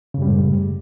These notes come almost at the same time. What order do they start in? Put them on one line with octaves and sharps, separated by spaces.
C#3 F#2 G3 G#3 A2